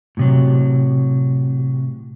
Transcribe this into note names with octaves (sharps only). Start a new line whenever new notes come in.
A2 C3 F#3